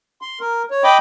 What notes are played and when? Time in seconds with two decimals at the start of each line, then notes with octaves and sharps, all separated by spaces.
0.21 C6
0.41 A#4
0.71 C#5
0.84 D#5 G5 B5 D6